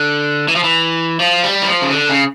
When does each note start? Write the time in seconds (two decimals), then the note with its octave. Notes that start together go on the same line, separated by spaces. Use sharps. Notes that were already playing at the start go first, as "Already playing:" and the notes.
Already playing: D3
0.48 E3
0.56 F3
0.64 E3
1.20 F3
1.44 G3
1.62 E3
1.67 F3
1.82 C#3
1.91 D3
2.09 C#3